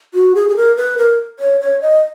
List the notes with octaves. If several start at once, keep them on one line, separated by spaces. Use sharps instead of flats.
F#4
G#4
G#4
A#4
B4
A#4
C#5
C#5
D#5